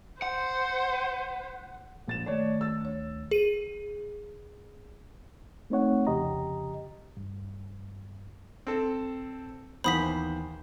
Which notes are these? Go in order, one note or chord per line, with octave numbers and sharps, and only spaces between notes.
C5 F#5
A#1 A6 E7
D#3 A3 C#5 D5
E6 A6
D2 C#5
G#4 D#7
A3 C4 D#4 C#5 F#5
C2 F2 C#3 G4 D#5 A#5
G2
C4 A4
D#2 E3 B3 C5 B5 D#6 B6